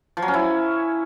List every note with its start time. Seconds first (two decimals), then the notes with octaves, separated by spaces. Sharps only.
0.17 F3
0.22 F#3
0.28 C#4
0.34 E4